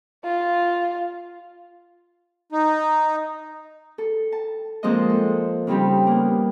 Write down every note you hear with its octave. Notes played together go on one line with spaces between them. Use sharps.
F4
D#4
A4
A5
F3 G#3 A#3 C4 D#5
A4
C#3 G3 C4 D#4 G4
A#3 B3